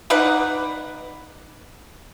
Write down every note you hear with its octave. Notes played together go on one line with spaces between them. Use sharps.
D#4 B4 D5 F#5